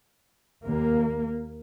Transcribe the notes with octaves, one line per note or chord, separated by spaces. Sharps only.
D#2 A#3